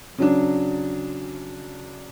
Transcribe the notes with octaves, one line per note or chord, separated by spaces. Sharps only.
C#3 F#3 D4